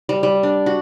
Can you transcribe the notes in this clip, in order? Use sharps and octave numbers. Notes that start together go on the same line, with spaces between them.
G3
G3
D4
F#4